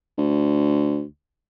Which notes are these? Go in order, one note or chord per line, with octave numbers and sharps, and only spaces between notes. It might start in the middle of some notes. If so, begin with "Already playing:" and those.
D2